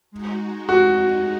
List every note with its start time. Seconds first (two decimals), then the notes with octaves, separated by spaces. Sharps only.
0.11 G#3 D#4 F#4
0.69 F#4